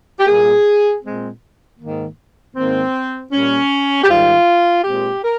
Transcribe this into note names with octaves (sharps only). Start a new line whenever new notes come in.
G4
A#2 G3 A#3 G#4
A#2 G#3 C4
G#2 D#3 A#3
G#2 D#3 A#3 C4
A#2 G3 A#3 C#4
G4
G#2 D#3 G3 F4
A#2 G#3 C4 G4
A#4